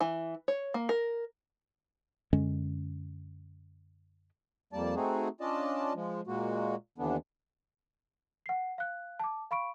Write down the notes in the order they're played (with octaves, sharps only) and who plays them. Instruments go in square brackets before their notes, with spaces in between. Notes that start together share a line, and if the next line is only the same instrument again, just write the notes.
[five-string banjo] E3
C#5
A#3
A#4
[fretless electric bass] F#2 D3 G#3 C#4
[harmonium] F2 G3 A#3 D5 A5
A3 C4 D#4 F#4 G#4
C#4 D4 F4 D5 D#5 A5
F3 G#3
A#2 G#3 A#3 F#4
D#2 D3 E3 B3 D4
[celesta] F#5 C7
F5 F#6
A5 D6
F5 B5 C#6 D7